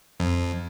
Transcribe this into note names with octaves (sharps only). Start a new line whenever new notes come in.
F2